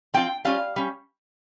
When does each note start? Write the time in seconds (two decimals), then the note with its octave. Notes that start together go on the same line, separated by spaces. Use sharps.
0.14 F3 C4 F4 G5
0.45 G3 C#4 F4 F5
0.76 G3 C#4